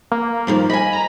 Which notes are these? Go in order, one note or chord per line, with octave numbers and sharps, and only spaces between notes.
A#3
G2 D#3 F3
D#5 G#5 B5
A#5